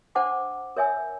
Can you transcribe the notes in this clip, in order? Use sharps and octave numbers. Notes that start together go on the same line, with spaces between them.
D4 C5 F#5 A5 D6
A#4 C#5 E5 G#5 E6